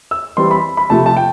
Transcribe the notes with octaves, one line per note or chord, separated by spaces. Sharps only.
E6
E3 G3 C4 C6
B5
B5
C3 F3 A3 A5
A5
G5